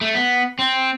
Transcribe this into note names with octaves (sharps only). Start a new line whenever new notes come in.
A3
B3
C4